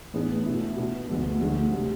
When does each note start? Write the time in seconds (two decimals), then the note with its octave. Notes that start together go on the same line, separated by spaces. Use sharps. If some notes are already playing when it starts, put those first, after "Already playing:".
0.14 A2 E3 B3 D4 G#4
0.46 B2 A3 E4
0.77 B2 B3 D4
1.09 D2 D3 G#3 B3
1.41 D2 D3 G#3 D4
1.72 C3 G#3